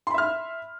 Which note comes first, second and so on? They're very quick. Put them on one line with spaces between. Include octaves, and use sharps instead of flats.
C6 B5 E5 F6